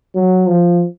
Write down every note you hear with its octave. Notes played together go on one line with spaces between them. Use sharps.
F#3
F3